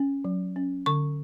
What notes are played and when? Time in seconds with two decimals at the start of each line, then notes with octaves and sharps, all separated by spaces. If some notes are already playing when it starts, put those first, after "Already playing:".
Already playing: C#4
0.25 F#3
0.56 C#4
0.86 D3 C#6